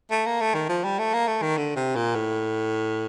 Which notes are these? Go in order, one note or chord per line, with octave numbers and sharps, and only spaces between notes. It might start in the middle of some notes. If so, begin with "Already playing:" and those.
A3
A#3
A3
D#3
F3
G3
A3
A#3
A3
D#3
D3
C3
A#2
A2